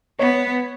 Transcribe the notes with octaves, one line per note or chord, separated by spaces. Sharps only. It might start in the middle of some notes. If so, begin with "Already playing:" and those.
B3 C#5